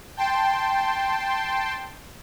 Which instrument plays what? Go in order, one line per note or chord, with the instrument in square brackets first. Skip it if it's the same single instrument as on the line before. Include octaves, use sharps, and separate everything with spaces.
[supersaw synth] G5 A5 C6